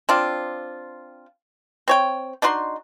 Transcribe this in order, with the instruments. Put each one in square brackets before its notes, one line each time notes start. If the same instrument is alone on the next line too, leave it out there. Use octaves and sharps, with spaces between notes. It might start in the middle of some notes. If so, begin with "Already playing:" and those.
[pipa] C4 D4 F4
C4 C#5 G5
D4 D#4 F#4 C6